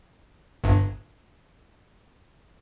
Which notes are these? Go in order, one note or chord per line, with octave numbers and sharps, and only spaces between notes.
G1 G2